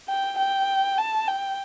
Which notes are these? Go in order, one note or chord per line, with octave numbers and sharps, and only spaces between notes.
G5
G5
A5
G5